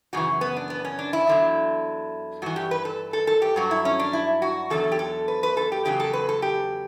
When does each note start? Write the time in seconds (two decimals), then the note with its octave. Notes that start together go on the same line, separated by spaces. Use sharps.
0.13 F#2 C#3 E3 F#4
0.41 B3
0.56 D4
0.70 B3
0.85 C#4
0.99 D4
1.13 E4
1.27 E2 D3 F#3
2.42 G2 E3 F#4
2.56 G4
2.71 B4
2.85 A4
3.13 A4
3.27 A4
3.42 G4
3.56 G2 F#3 F#4
3.71 E4
3.85 C#4
3.99 D4
4.13 E4
4.42 F#4
4.70 E2 D3 F#3 A4
4.92 G4
4.99 A4
5.28 B4
5.43 B4
5.57 A4
5.72 G4
5.85 E2 C#3 F#3 G4
6.00 A4
6.13 B4
6.29 A4
6.42 G4